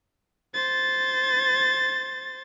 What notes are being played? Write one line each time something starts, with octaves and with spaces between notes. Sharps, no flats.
C5 A6